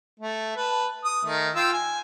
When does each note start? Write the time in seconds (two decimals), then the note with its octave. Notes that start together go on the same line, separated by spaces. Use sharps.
0.20 A3
0.56 B4 A5
1.05 D#6
1.25 D#3 A3
1.55 F4 G5 E6
1.73 G#5